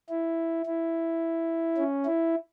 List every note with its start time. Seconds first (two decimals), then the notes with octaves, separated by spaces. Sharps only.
0.10 E4
0.66 E4
1.78 C#4
2.06 E4